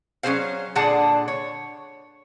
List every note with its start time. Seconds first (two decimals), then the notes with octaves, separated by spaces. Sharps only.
0.23 F#3 C#4 F4 G#4 C5 F5
0.75 A#2 D3 D4 G#4 F#5 A5
1.28 C#5